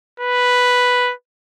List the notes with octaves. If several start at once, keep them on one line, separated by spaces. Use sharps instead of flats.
B4